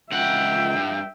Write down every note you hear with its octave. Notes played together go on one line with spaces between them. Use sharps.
C#2 E5 F#5 G5
G2